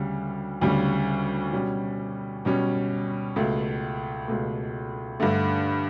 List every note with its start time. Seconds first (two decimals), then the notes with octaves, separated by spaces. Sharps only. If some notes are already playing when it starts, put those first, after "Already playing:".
Already playing: D2 C#3 G3
0.61 D2 C#3 G3
1.53 B2 G3 C#4
2.45 B2 G3 C#4
3.36 C#2 B2 A3
4.28 C#2 B2 A3
5.20 G2 D3 A3